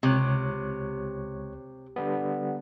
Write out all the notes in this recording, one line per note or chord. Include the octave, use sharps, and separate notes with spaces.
C#2 C3 C#5 F#6
D3 G3 B3